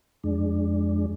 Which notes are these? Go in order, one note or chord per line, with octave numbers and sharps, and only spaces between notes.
F2 G#3 D4